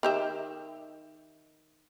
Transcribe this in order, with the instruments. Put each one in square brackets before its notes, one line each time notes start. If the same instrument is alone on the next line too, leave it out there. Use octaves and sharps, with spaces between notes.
[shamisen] D#3 G4 E5